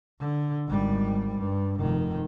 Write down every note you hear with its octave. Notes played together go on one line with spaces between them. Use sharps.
D3
G#1 G3
G2
F1 D#3